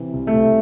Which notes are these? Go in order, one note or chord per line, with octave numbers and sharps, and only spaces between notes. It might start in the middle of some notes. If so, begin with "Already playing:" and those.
Already playing: C3 E3
C2
A3
C2